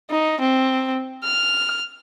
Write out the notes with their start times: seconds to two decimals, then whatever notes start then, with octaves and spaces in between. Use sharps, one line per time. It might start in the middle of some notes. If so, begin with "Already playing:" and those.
0.10 D#4
0.41 C4
1.24 F6